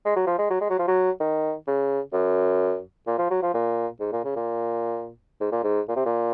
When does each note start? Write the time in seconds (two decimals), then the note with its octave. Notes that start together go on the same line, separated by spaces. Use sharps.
0.05 G#3
0.16 F#3
0.27 F3
0.38 G#3
0.50 F#3
0.61 G#3
0.70 F#3
0.79 F3
0.88 F#3
1.20 D#3
1.67 C#3
2.13 F#2
3.07 A#2
3.18 F3
3.31 F#3
3.42 F3
3.54 A#2
4.00 G#2
4.12 A#2
4.25 C#3
4.36 A#2
5.41 G#2
5.52 A#2
5.64 G#2
5.88 A#2
5.96 C3
6.05 A#2